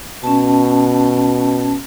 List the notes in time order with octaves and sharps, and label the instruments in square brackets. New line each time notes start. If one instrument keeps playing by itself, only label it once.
[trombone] B2 [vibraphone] C#4 A5